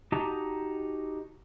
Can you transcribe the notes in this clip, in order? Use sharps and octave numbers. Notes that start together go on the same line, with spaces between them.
D#4 F#4 G4 D#5 A5 A#5